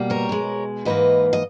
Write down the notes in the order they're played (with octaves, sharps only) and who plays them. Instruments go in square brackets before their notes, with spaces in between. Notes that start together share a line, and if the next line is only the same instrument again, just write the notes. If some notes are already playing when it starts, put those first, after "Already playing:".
Already playing: [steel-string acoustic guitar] B2 G3 A#3
A#4 C#5
B2 G#3
G#2 E3 A#3 B4 D#5
D#5